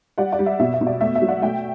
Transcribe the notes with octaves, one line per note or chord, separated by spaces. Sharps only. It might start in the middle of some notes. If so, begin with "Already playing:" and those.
G3 D5 F#5
D5
G3
E5
B2 E5
E5
B2
D5
A3 E5
E5
F#3
D5 F#5
A3 E5 G5